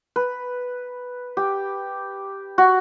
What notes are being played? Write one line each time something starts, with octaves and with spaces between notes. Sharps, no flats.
B4
G4
F#4